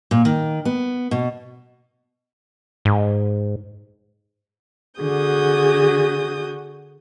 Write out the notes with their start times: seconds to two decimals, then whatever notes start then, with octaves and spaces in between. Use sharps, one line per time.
0.11 A#2
0.25 D#3
0.65 B3
1.11 B2
2.85 G#2
5.00 D3 F#4 G#4 D#6 G6